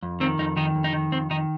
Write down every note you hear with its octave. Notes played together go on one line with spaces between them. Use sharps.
F2
D#3 C4
F2 D#4
D#3 D#4
F2
D#4
D#3
F2 C4
D#3 D#4